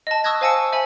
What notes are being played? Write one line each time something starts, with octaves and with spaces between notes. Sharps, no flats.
D#5 A5
C#6 D#6 E6 F#6 G#6 A#6
C5 F5 G#5 A5 E6 C#7
C5 E5 G#5 B5